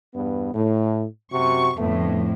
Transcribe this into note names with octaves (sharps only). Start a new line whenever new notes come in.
E2 G2 B3
A2
F#2 C3 F#4 C#6
F2 A2 D3 A3 B3